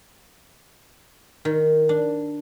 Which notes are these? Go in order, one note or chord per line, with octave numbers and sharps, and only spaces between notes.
D#3
D4